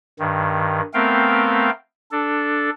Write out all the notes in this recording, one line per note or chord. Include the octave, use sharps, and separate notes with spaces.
G2 D#3
A3 B3 C4 A#4 F5 G5
D4 A4